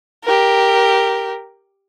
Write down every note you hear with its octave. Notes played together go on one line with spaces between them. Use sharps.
G4 A#4